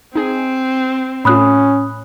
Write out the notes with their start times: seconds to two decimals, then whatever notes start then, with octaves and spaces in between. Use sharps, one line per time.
0.15 C4 D#4 G#4
1.25 A2 C#4 F4 B5 D#6 F#6